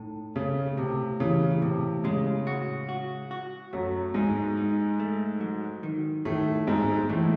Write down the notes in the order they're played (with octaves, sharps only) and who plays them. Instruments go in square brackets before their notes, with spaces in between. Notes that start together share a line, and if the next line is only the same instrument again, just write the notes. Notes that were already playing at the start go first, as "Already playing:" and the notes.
Already playing: [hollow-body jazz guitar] A2 D#4
[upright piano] C#3 [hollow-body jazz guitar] A3
[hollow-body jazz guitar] A2 [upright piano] C3
[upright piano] C#3 [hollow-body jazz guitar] E3
[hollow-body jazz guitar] A2 [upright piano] C3
[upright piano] C#3 [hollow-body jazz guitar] G#3
[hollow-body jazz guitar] F#4
F#4
F#4
[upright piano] F#2 F#3 [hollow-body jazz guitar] A3
[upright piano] G#2 G#3 [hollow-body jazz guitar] D#4
[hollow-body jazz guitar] D#4
A3
F#3
D#3
[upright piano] A2 A3 [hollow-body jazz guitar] D#3
[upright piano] G#2 G#3 [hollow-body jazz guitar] C4
[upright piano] A2 A3 [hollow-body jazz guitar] E3